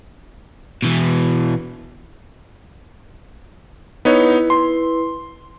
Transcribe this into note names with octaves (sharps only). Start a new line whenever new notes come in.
B2 E3
B3 D#4 E4 B4 C#5
C6